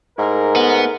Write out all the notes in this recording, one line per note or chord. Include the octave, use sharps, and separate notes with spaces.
G#2 A3 E4 A#4
B3